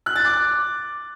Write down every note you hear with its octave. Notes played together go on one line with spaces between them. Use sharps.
F#6
A6
D6